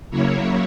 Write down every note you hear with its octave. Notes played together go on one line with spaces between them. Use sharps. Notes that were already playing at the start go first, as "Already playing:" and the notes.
C#3 F#3 A#3 E4 C#5